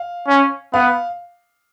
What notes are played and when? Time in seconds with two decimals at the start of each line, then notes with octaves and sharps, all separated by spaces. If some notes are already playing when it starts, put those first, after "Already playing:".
Already playing: F5
0.28 C#4
0.74 B3 F5